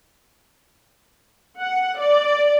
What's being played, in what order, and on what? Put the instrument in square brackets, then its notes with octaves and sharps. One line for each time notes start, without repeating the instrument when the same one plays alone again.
[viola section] F#5
D5